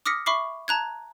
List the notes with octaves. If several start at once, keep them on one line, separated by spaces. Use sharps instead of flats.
D6 D#6 F6 A#6 B6 C#7
E5 B5 C#6 D6 C7
A5 A#5 F#6 G#6